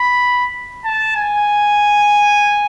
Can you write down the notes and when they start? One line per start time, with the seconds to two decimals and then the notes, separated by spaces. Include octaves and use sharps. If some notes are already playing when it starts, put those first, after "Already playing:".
Already playing: B5
0.85 A5
1.16 G#5